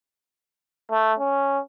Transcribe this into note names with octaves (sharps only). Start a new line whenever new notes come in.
A3
C#4